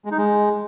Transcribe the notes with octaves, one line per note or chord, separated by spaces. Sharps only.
G#3
D#4
G#3